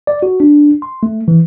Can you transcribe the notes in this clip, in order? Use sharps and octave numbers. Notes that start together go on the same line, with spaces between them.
D5
F#4
D4
C6
A3
E3